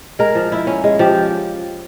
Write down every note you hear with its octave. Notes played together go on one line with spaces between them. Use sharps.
G#3 A#4
F3
E4
C#4
G#3
F3 G4